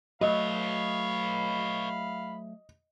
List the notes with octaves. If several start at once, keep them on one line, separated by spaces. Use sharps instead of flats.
F#3 A3 B4 C#5 D#5 F5 B5